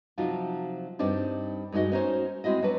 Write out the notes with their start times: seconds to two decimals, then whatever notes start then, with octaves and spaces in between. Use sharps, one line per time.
0.18 C3 F3 F#3 D#4 F4 F#4
0.99 G2 G3 C4 D4 D#4
1.72 G2 G#3 D#4 F#4 D#5
1.92 B3 C#4 D#4 F#4 C5 C#5
2.44 G#3 C4 E4 F#4 D#5
2.62 F#3 D4 B4